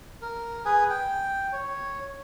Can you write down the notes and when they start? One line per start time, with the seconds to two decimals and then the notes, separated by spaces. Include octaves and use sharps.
0.22 A#4
0.65 G#4 B4 G#5
0.90 G5
1.53 C#5